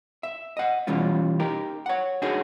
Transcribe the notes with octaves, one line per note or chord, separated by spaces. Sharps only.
E5
D#5 F#5
B2 E3 G3 C#4 F4
D#4 G4 A#4
C#5 F#5
D4 D#4 F#4 G#4 A#4 C#5